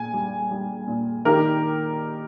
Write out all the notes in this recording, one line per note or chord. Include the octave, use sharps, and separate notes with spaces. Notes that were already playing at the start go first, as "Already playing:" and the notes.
Already playing: A#2 G#5
G3
G3
A#2
D#3 G4 A#4